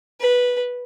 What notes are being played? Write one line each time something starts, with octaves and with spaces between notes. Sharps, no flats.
B4